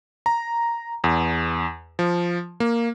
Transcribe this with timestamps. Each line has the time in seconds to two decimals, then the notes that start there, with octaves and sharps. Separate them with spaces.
0.26 A#5
1.04 E2
1.99 F3
2.60 A#3